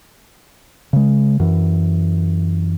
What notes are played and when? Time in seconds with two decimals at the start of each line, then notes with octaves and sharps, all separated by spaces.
0.93 C#3 G#3
1.40 F#2 E3